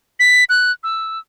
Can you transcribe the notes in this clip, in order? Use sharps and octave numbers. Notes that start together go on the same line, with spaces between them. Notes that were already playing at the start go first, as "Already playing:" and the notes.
B6
F#6
E6